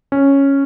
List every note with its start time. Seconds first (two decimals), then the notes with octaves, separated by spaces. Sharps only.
0.12 C#4